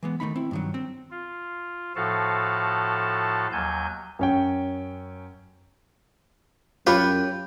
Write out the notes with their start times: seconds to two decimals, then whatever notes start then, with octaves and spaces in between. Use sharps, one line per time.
0.03 E3 G#3 B3
0.20 D#3 A3 D#4 B5
0.36 C4 E4
0.51 G2 D#3 F#3
0.74 C4
1.11 F4
1.96 A2 F3 F#4 A4 F5 A5
3.52 D#2 F#3 G#5 G6
4.19 F#2 C#4 G5
6.87 F#2 F4 G4 B4 C#5 B5